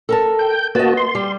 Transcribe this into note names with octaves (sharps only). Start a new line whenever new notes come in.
A4 A#4 A5
G5 G6
A#3 F#4 B4 D#5 A5
C6
G3 G4